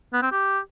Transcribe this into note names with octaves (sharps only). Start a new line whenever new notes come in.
B3
C4
G4